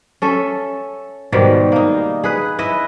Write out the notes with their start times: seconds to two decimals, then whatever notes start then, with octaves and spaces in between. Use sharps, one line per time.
0.22 C#4 A4 E5
1.32 G#2 B2 D#3 G3
1.72 A#3 D#4
2.24 G#4 B4
2.59 E4 B4 D#5 E5